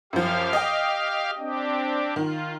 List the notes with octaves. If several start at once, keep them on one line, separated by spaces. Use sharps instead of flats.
F#2 F3 G4 F5
D#5 G5
C4 D4 G4
D#3 F4